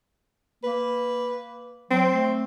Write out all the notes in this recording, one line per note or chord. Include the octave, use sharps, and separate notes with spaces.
A#3 B4
F#3 C4
A3